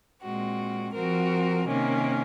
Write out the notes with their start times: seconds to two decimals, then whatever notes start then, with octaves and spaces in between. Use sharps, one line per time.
0.22 A#2 G#3 C4 F#4
0.95 F3 C4 F#4 A#4
1.67 C3 D#3 A#3 C#4